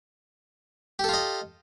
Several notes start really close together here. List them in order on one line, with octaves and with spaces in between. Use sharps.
G4 A4 F4 D#5